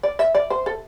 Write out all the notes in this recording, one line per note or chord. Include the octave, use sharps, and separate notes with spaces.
D5
E5
D5
C5
A4